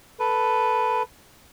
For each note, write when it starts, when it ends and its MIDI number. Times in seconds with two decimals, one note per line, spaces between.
0.19 1.03 69
0.19 1.03 71